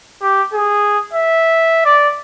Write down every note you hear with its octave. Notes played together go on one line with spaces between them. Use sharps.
G4
G#4
E5
D5